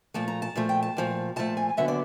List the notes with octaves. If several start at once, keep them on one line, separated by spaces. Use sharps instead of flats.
A#2 F3 A3 A5
A#5
A5
A#2 F3 A3
G5
A5
A#2 F3 A3
A#2 F3 A3 A5
G#5
D#2 D3 F#3 B3 E5
D5